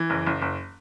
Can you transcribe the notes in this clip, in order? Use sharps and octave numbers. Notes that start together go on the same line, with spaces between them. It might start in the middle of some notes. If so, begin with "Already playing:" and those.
Already playing: E3
F#1
F#1
F#1